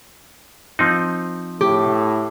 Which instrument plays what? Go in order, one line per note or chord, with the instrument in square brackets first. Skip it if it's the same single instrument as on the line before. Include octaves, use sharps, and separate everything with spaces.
[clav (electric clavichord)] F3 C4 D#4
[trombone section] A2 [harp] G4